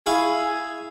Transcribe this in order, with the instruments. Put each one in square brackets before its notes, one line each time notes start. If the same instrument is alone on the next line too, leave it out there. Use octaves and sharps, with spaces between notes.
[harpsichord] E4 F5 C#6 [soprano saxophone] G#4